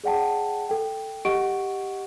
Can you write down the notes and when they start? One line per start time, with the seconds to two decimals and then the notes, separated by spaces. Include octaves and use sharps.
0.04 G#4 D5 F#5 G5 A5
0.69 A4 G5
1.25 G4 D#5 F#5 C#6 D7